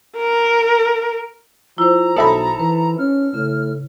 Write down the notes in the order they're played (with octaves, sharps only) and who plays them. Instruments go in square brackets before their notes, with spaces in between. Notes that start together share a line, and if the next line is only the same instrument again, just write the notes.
[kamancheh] A#4
[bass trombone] F3 [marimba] E4 C5 [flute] A#5
[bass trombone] B1 [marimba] D#4 [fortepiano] A4 E5 B5
[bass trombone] E3 [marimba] B4
[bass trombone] C#4 [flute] F6
[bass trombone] A2 [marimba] C#3